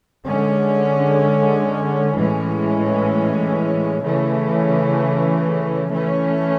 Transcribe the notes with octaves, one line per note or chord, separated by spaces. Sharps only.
D3 G#3 C#4
A2 E3 G#3 C#4
C#3 E3 A3 C#4
E3 A3 C#4